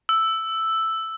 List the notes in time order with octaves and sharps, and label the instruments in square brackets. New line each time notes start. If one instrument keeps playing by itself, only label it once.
[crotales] E6